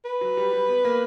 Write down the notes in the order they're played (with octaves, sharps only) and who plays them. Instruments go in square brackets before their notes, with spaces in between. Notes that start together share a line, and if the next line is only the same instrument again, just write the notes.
[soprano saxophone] B4
[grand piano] F#3
G3
G3
B3
A#3